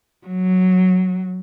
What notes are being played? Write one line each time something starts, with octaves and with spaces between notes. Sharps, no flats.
F#3